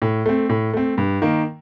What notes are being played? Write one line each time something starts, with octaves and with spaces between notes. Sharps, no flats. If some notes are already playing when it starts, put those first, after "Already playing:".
A2
A3 C4
A2
A3 C4
G2
D#3 A#3